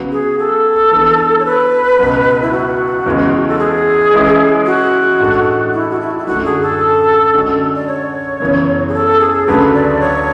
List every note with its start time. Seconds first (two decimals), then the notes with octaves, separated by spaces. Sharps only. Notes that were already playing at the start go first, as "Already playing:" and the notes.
Already playing: C#3 F#3 B3 F#4 B4
0.12 G#4
0.39 A4
0.92 E3 B3 D4 G#4
1.40 C#5
1.45 B4
1.99 C#2 B2 F#3
2.42 E4
2.52 F#4
3.06 E2 C#3 E3 G#3 B3
3.48 A4
3.59 G#4
4.13 E3 G#3 C#4 E4 B4
4.66 F#4
5.20 A2 G#3 D4 A4
5.73 E4
5.90 F#4
6.01 E4
6.19 E4
6.27 F#2 D3 A3 F#4
6.45 G#4
6.62 A4
7.34 D3 G#3 C#4 F#4
7.76 D5
7.88 C#5
8.40 F#2 C#3 E3 B3
8.88 G#4
8.94 A4
9.21 G#4
9.47 D2 C#3 F#3 A3 D4 B4
9.74 D5
10.01 C#5